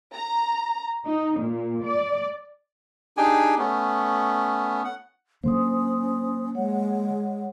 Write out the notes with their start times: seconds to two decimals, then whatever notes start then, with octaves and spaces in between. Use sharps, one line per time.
0.14 A#5
1.05 D#4
1.39 A#2
1.84 D5
3.17 D4 D#4 G4 G#4 G5 G#5
3.58 A3 B3 C#4
4.84 F#5
5.44 D3 F#3 A#3 C#4 C5 C6 D#6
6.55 G#3 C#5 F#5